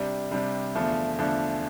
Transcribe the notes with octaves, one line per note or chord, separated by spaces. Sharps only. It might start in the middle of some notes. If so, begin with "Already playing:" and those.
Already playing: C3 G3 D4
C3 G3 D4
E2 D3 F3 A3
E2 D3 F3 A3